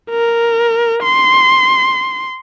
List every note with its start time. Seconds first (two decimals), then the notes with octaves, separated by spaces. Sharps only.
0.11 A#4
1.03 C6